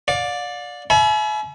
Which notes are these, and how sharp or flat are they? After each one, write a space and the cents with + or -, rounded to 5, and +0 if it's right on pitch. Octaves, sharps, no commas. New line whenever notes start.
D5 +0 F5 +40
E5 +25 G#5 +45 B5 -35